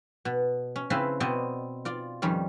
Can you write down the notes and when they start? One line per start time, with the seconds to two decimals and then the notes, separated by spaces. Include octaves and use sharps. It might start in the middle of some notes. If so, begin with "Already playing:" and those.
0.25 B2
0.76 C#4
0.90 C#3 C4 E4 B4 F5 A5
1.20 B2 B3 C4 D5 D#5
1.85 F4 D5
2.22 F2 D#3 G3 C#4